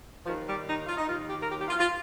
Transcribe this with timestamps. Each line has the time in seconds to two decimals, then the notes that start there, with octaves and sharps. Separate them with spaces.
0.24 D#2 D#3 F3
0.46 G3
0.66 D#4
0.87 F4
0.97 D#4
1.07 D#2 D#3 F4
1.28 G4
1.41 A#4
1.48 G4
1.58 G4
1.68 F4
1.79 F4